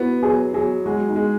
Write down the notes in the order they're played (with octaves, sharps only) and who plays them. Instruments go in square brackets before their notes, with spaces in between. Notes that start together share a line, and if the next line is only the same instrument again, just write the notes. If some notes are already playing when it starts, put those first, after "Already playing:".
Already playing: [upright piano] B3 [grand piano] E4 F#4
[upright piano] F#3 [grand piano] G#4
[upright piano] F#3 [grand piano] G#4
[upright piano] G#3 [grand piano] F#4
[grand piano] D#4
[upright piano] G#3